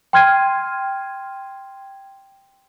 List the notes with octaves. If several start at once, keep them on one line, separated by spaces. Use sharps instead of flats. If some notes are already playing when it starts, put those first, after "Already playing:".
G5 C6 F6 G#6 C7 D#7